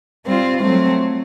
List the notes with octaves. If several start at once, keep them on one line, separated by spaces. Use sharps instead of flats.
G3 C4 F4
F#3 A3 C4